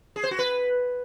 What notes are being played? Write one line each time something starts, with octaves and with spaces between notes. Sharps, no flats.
G#4
C5
F#4
B4